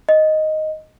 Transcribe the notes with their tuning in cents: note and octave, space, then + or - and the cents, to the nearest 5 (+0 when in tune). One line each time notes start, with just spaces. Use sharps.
D#5 +0